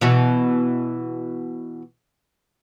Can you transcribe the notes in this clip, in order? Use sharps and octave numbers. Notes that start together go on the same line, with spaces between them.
B2 E3 F#4